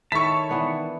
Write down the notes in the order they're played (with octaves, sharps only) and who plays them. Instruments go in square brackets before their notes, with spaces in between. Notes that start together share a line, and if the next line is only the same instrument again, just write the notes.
[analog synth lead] D#3 [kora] E4 A4 [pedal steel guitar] C#5 A5 [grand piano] C#6 B6
[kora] E3 B3 D4